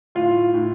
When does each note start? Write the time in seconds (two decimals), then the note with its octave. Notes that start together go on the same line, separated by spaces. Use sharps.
0.15 A2 F4
0.54 A2